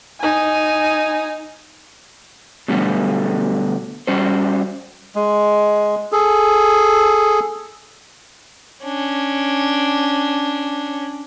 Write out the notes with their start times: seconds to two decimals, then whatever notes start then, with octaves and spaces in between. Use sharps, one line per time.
0.21 D#4 G#5
2.68 B2 D3 F#3 G3 A3 B3
4.07 G3 C#4 F#4 C5
5.15 G#3
6.12 G#4 A4
8.84 C#4 D4